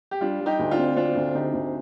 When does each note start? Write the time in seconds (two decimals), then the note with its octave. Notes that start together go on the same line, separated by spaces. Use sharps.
0.11 G4
0.21 G3 D4 F4
0.40 G3
0.46 D#4 G4
0.59 D2
0.71 D4 F4
0.78 C4
0.96 C4 D4 F4
1.15 D2
1.35 D3 D#4 G4
1.54 D2